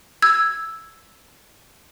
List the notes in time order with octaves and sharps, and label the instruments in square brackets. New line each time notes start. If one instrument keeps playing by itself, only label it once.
[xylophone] E6 G#6